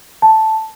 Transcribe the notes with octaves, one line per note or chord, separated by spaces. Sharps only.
A5